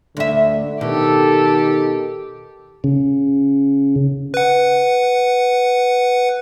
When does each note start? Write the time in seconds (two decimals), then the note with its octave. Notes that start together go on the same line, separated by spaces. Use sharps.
0.17 D2 D3 E5
0.81 B2 D#3 G4 A4
2.84 C#3
4.34 B4 F#5